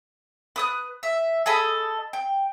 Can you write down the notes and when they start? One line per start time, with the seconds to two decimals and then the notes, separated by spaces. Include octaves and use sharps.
0.56 B4 D#6 F#6
1.03 E5
1.46 G#4 A4 D#5 B5
2.13 G5